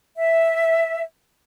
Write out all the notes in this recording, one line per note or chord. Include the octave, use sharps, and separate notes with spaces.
E5